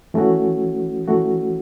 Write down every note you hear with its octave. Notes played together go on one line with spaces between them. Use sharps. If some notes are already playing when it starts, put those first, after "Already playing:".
E3 A3 C#4 F#4
E3 A3 C#4 F#4